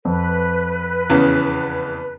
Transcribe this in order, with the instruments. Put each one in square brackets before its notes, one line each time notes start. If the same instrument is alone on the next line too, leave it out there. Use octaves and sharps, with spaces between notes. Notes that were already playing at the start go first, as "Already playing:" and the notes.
[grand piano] F2 [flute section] B4
[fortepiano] E2 C#3